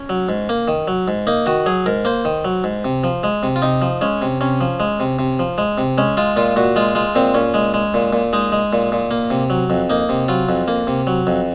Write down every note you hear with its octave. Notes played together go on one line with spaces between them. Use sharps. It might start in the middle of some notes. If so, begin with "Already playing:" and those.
Already playing: C#4
F#3
G#2
A#3
D#3
F#3
G#2
A#3 D#4
D#3 F#4
F#3 G#4
G#2 A#4
A#3 C5
D#3
F#3
G#2
C3
F3
G#3
C3
F4
C3 D#4
F3
G#3 C#4
C3
C3 C#4
F3
G#3
C3
C3
F3
G#3
C3
G#3 C#4
G#3 F4
A#2 F4
A#2 F#4
G#3 F4
G#3 F4
A#2 C4
A#2 C#4
G#3
G#3
A#2
A#2
G#3 D#4
G#3
A#2
A#2
A#3
C3
F#3
F2
A#3 D#4
C3
F#3 F4
F2
A#3
C3
F#3
F2